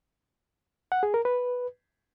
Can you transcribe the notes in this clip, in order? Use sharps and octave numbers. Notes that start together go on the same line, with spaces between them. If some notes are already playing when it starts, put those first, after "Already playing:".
F#5
G#4
A#4
B4